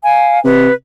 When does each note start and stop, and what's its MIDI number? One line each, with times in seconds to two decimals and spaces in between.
0.03 0.39 77
0.03 0.39 80
0.44 0.69 48
0.44 0.72 71